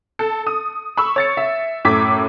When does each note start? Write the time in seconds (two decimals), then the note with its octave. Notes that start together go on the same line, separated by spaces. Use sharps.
0.19 A4
0.47 D#6
0.97 B5 C#6 E6
1.16 C#5 A6 C#7
1.37 E5
1.85 F#2 A2 D6 G#6 B6